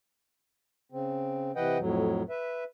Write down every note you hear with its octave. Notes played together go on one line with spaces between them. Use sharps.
C#3 C4
C3 E3 B4 D#5 F#5 G5
F2 A2 F#3
B4 E5